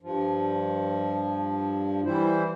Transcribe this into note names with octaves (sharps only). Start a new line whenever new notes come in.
G2 F3
E3 G3 E4 C5